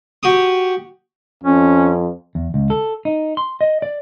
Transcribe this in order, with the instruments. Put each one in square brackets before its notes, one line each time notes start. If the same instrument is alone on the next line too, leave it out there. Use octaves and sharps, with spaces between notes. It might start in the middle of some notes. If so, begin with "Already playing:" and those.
[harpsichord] F#4 G4 D#6
[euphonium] F2 [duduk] C#4
[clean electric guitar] E2
C#2
A4
D#4
C6
D#5
D5